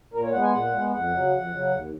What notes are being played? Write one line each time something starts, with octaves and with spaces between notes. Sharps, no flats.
A#2 A#4
C#5
G#3 B3 F#5
G#5
A#2 F#5
G#3 B3
F2 F#5
C#3 F#3
F2
C#3 F#3
D#2